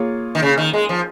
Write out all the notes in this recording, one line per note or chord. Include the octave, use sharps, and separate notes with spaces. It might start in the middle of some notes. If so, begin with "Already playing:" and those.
Already playing: A#3 F4 G#4 C#5
D#3
C#3
D#3
G#3
F3